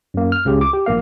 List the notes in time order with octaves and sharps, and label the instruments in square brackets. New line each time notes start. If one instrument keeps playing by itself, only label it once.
[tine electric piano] F#2 A#3
F6
C#2 C#3 G4
D6
G4
A#1 A#3 F5